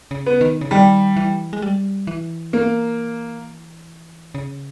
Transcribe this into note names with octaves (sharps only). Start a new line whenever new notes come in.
C#3
B3
D#3
C#3
D#3 G3
E3
G#3
G3
E3
A#3
C#3